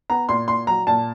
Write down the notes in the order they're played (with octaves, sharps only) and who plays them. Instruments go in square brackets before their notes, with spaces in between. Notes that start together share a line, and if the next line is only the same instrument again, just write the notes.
[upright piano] B3 A#5
A#2 C6
A#2 C6
F#3 A#5
A#2 A5